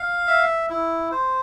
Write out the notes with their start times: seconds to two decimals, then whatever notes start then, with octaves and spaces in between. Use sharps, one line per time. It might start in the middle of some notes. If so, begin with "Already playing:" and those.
Already playing: F5
0.27 E5
0.70 E4
1.11 C5